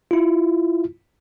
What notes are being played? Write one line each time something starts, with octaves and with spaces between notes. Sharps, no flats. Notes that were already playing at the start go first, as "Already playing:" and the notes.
E4 F4